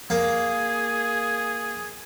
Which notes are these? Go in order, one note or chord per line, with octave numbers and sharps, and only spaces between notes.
A#3 G#4